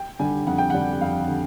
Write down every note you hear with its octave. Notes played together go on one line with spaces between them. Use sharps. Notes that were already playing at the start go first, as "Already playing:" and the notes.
Already playing: G5
D3 G3 G#5
F2 F#5
G5
D3 G3 F#5
F2 F5
D3